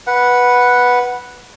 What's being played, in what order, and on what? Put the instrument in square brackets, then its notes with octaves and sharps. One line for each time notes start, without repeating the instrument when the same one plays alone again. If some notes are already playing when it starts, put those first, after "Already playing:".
[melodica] B4 F#5